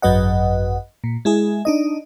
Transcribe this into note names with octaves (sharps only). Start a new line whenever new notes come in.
G#1 F#2 F#3 B4 D#5 F#5
A#2
G#3 E4 G#4
D4 D#4 D#5